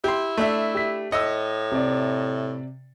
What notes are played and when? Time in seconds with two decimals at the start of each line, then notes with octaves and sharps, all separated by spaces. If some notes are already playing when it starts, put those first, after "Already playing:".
0.04 E4 G4 C6
0.38 A3 D4 E5
0.75 G4 B6
1.12 A2 D#5 E6 C#7
1.72 C3 D5